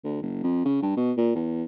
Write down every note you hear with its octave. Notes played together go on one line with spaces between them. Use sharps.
D2
F#1
F2
C#3
G2
B2
A#2
E2